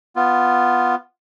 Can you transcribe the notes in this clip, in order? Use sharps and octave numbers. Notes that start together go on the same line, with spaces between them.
B3 F4